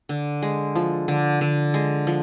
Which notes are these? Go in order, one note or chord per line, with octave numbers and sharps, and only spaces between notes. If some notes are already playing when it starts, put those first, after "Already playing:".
D3
G#3
F3
D3
D3
G#3
F3